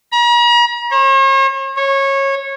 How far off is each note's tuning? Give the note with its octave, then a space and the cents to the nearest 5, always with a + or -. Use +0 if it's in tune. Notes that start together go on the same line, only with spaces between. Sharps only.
A#5 +45
C#5 -45
C#5 -20